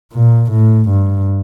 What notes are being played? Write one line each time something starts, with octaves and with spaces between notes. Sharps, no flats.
A#2
A2
G2